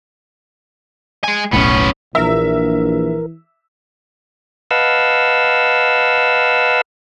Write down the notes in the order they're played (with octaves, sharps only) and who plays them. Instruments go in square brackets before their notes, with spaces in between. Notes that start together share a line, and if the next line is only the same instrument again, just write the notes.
[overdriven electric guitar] G#3 G#5
[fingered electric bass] D#1 B1 A2 [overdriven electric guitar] B3 C#4
[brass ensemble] A#1 [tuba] E3 [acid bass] A#4 [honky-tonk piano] E5 E6
[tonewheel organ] B4 D#5 F5 F#5 A5 E6